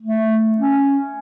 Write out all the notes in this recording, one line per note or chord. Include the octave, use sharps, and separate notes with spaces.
A3
C#4